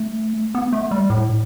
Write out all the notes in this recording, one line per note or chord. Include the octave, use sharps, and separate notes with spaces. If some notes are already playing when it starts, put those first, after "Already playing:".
Already playing: A3
B3
A3
G3
A2